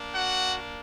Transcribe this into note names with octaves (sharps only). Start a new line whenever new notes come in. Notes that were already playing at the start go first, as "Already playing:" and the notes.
Already playing: A#3 D4
F#4 F#5